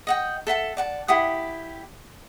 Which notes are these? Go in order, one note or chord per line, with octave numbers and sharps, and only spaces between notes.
D#5 F#5 G5
A4 E5 F#5 A5
D5 F#5 A5
E4 G4 F#5 D#6